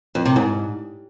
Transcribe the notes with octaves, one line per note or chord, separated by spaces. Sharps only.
F2
C3
G#2